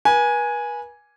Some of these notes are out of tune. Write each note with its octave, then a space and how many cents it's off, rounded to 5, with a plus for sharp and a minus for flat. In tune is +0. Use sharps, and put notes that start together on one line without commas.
B4 -40 G#5 +0